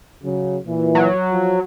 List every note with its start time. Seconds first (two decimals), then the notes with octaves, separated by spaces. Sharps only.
0.23 C#3 F#3
0.66 A#2 E3
0.95 F#3
1.31 F3